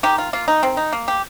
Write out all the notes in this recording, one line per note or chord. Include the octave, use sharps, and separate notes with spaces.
D#3 G4
F4
A#3 F4
D#4
D#3 C4
D#4
A#3
G4